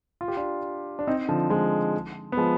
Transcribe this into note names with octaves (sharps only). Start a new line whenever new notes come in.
F4
G4
D4 F4
D4
C4 D#4
D3 F3
F3 G#3
B3
F3 G#3